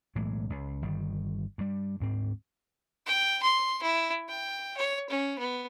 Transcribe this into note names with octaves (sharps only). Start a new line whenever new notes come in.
B1 A2 E3 G#3
C#2
G1 D#3 G3
G2 G3
D2 G#2 C4
G5
C6
E4
G5
C#5
C#4
B3